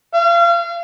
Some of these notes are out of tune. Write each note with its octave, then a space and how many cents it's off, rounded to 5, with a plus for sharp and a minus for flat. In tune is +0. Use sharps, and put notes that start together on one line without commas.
F5 -35